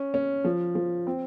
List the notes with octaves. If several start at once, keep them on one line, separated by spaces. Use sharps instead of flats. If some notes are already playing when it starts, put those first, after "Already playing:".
Already playing: C#4
C#4
F3
F3
C4